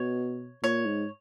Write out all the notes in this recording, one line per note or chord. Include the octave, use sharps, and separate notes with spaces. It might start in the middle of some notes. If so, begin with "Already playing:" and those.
Already playing: B2 C#5
A#2 C#5
G#2